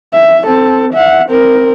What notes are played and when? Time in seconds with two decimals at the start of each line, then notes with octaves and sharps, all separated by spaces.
0.13 E5
0.45 C4 A4
0.93 E5 F#5
1.29 C4 A#4